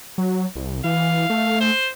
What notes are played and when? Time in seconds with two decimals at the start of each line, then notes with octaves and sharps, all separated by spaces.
0.18 F#3
0.55 C2
0.84 E3 F5
1.30 A3
1.60 C5